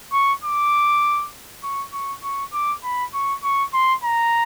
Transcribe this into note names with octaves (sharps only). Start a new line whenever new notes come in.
C#6
D6
C#6
C#6
C#6
D6
B5
C#6
C#6
C6
A#5